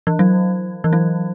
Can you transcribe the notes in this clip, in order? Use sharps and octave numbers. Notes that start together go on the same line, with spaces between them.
E3
F#3
E3
F#3